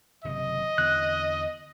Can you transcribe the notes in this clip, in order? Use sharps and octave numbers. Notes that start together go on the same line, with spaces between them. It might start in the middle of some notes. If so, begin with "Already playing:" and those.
F#1 C3 D#3 D#5
E2 D3 E3 F#6